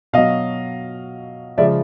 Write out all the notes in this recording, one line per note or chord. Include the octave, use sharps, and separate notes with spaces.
B2 F#3 D#5 F5
C#3 F3 G#3 D5 E5